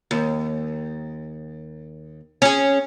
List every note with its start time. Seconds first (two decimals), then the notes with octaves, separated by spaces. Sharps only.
0.11 D#2
2.42 C#4 G#4